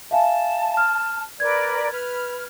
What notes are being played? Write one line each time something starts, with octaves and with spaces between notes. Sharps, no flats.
E5 F5 G#5 A5
F6
A#4 B4 D5 G#6
B4 F6